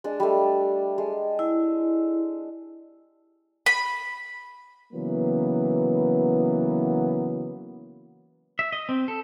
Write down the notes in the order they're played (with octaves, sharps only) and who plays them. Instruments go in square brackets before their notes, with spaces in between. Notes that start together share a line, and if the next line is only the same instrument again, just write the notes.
[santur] G#3 D4 A5
G3 A3
G#3
[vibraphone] E4
[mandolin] B5
[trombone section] C#3 E3 F#3 A#3 B3
[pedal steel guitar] E5
D#5
C4
A4